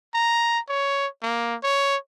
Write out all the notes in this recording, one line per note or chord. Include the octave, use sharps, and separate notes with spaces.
A#5
C#5
A#3
C#5